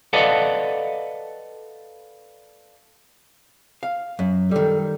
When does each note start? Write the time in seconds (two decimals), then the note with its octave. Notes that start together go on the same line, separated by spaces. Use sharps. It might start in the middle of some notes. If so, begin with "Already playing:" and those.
0.13 A4 B4 D5 D#5 F5 F#5
3.83 F5
4.19 F#2
4.51 D#3 G3 A4